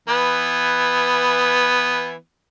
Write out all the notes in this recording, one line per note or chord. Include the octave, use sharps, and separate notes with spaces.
E3 B3